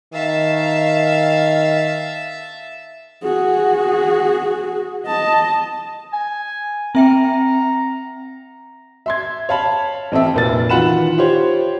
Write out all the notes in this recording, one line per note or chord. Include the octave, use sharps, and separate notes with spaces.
D#3 E5 F5 A5
F#4 G#4
D#5 A5
G#5
C4 E5 G5 A#5
E5 C6 G#6
C#5 F5 A5 B5
A1 C4 A4 E5
F1 A#2 A6
D#3 E3 F4 F#5 B5 E7
F4 G4 C5 C#5